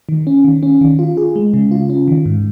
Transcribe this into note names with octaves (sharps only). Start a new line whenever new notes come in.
D#3
C#4
D#3
C#4
D#3
F4
G#4
G#3
C#3
F4
C#4
D#3
G#2